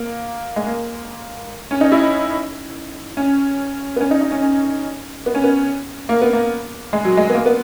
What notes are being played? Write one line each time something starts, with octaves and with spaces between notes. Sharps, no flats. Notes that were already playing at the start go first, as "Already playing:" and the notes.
Already playing: A#3
G#3
A#3
C#4
D#4
E4
C#4
B3
C#4
D#4
D#4
C#4
C#4
B3
C#4
B3
A#3
B3
A#3
G#3
F#3
G#3
B3
A#3
B3